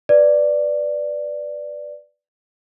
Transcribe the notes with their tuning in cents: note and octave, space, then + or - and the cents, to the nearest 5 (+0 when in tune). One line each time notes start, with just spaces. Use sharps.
B4 +0 D5 +0